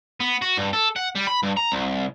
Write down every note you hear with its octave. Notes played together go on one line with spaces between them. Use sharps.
B3
F#4
G2
A4
F#5
G3
B5
G2
A#5
C2